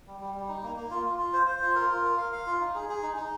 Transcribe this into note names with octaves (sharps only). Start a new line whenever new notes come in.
G3
G3
G3
D#4
A#3
A#3
F4
F4
F4
C5
C5
F4
A#4
F4
A#4
F5
F5
F4
D#4
G#4
G#4
D#4
D#4